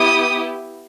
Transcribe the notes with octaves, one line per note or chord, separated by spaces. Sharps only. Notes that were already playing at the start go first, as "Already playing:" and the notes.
Already playing: B3 E4 G4 D#6